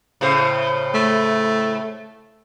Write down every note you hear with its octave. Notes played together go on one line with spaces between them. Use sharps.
A2 C#3 C5
A3